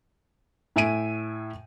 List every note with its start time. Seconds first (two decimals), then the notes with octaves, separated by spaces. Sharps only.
0.76 A2 E5 G#5 D7 D#7